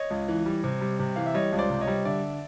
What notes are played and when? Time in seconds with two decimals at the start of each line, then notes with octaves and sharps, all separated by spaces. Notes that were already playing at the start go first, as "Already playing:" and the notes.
Already playing: C#5 D#5
0.10 C#2
0.28 E3
0.46 G3
0.64 C3
0.81 G3
0.99 C3
1.16 E3 F5
1.26 E5
1.34 G3 C#5 D#5
1.52 C#2
1.58 C5 D5
1.70 C3
1.81 C#5 D#5
1.87 G3
2.05 D3 D5 E5